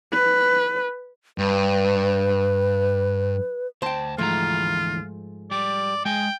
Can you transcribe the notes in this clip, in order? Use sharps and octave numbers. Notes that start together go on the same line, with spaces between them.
B4
G2 B4
D2 C5 G5 A5
D2 G#2 E3 F3 A3 F4 A#5
G3 D5
G#3 G5 G#5